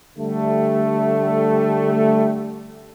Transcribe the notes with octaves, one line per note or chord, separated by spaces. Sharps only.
D3 G3 A3